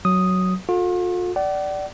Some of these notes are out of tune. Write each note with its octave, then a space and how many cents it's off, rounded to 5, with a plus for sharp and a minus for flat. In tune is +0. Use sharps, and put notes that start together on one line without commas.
F#3 +0 D#6 +0
F4 +45 A4 +0
D5 +0 F#5 +40